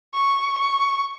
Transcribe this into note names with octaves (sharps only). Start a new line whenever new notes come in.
C#6
C#6